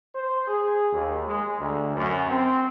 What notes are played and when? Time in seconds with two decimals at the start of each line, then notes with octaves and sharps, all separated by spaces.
0.15 C5
0.48 G#4
0.93 D#2
1.28 G#3
1.60 D2
1.96 F#2
2.30 C4